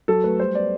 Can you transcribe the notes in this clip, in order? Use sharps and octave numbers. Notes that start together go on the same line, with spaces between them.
F#3 A4
A3 B4
G3 C5
B3 D5